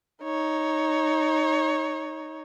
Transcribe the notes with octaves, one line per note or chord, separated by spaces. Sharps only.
D#4 C#5